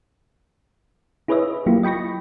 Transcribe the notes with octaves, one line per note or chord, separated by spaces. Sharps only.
E4 G#4 B4 C#5 D#5 E5
F#3 A#3 E4 F4 G4
D#5 G5 B5 C#6 A#6